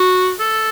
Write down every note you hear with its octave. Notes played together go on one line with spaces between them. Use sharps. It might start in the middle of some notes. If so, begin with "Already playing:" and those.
Already playing: F#4
A4